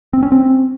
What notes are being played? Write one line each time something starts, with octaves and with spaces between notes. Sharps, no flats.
C4
C#4
C4